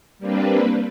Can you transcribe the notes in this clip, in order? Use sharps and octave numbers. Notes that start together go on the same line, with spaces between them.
G3 A#3 C4 D4 B4